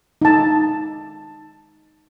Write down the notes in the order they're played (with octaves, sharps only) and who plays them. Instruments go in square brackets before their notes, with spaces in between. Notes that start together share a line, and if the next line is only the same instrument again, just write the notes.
[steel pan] D#4 A5